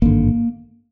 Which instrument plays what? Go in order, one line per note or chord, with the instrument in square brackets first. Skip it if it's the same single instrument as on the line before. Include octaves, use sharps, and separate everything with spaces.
[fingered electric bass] G#1 G2 D3 A#3